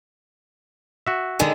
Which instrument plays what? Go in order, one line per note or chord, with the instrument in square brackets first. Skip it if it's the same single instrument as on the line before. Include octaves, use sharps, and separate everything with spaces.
[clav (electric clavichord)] F#4 E5
[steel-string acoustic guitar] D3 D#3 G#3